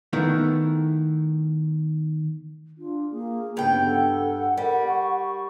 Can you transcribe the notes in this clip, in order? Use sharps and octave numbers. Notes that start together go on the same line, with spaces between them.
D#3 A3 B3 E4
D4 F4
A#3 G#4
G2 C#3 B3 G5
A4 F#5
G3 A#4
C#6